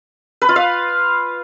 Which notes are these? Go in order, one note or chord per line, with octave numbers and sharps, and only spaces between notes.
B4
F4
F5